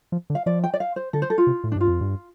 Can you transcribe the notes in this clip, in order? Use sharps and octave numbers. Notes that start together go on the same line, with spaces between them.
F3
D3
F5
F3 D5
G5
D5
F5
C5
D3 A4
C5
A4
F4
C3
A2
D4
G2 F4
F2
G2